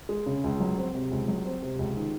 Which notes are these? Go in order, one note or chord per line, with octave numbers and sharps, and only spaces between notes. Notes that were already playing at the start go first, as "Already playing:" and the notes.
G#3
C#3
C#2
F#3
C4
C3
C#2
F#3
C4
C3
C#2
D#3